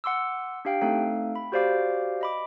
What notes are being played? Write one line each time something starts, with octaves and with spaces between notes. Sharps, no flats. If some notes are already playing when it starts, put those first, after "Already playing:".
F#5 C6 D6 E6
D4 G4 F5 G5
A3 C4 D#4 A4 F5
B5
F#4 G4 C5 D5 F5 D6
D#5 B5 D6